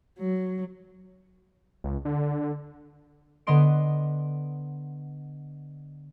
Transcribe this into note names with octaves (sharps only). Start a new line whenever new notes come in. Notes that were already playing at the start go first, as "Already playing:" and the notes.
F#3
C#2
D3
D3 B3 D#5 C6 D7